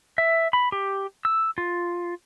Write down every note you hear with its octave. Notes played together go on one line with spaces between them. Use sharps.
E5
B5
G4
E6
F4